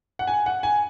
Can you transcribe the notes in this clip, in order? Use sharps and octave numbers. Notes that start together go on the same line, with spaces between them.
F#5
G#5
F#5
G#5